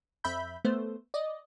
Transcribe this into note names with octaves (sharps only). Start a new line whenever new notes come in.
F2 E5 B5 G6
A3 B3 C5
D5 D#5